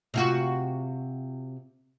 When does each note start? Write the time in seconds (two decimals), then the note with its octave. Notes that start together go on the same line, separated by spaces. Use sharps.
0.14 C3 F4 F#4